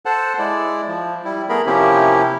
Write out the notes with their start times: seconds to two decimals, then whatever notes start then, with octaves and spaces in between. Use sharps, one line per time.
0.06 A4 C5 F#5 A5
0.39 G#3 E4 D5
0.88 F3
1.25 G3 E4
1.49 A3 B3 G#4 A#4 B5
1.66 C3 F3 A#3 C#4 E4 G4